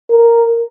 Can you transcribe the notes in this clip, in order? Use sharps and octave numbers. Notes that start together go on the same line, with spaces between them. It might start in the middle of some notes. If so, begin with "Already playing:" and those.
A#4